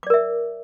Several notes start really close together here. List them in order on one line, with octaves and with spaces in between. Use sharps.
D6 D5 A#4 E5